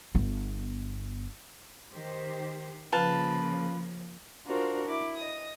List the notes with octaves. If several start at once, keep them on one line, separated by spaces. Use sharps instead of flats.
G1 B3
D#3 G4 C5
C#3 F3 A#3 F4 B4 A5
D4 F4 F#4 A#4 C5
E4 D6
D#5 D#6